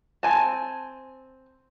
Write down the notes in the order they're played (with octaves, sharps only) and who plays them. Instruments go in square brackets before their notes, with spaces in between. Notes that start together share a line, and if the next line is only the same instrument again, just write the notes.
[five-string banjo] C4 G#5 A5